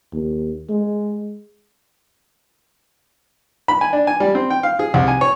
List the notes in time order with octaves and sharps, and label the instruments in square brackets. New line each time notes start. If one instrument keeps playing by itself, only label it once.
[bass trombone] D#2
G#3
[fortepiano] B5
G#5
D4
G#5
G3
C4
G5
F5
G#4
C2
G#5
C#5